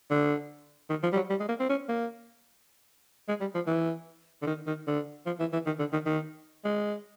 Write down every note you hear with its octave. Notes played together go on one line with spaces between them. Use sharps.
D3
D#3
F3
G3
F#3
G3
G#3
A#3
C4
C#4
A#3
G#3
G3
F3
E3
D3
D#3
D#3
D3
F3
E3
E3
D#3
D3
D#3
D#3
G#3